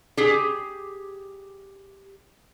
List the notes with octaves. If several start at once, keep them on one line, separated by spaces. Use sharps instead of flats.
G4 G#4